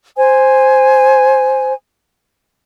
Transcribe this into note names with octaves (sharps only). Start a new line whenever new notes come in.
C5 G#5